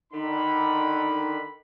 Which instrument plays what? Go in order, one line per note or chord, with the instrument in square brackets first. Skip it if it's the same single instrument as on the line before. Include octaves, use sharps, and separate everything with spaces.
[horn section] D3 D#3 B5 [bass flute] D#4